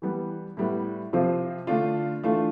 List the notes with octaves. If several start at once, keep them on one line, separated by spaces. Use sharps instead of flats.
E3 G3 B3
A2 G3 B3
C3 F3 C4 F4
D3 A3 D4 F4
E3 A3 D4 F4